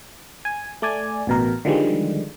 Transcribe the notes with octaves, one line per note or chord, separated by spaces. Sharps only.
G#5
A3 D5 G#5
A1 B2 A#4
D3 D#3 F3 G3 G#3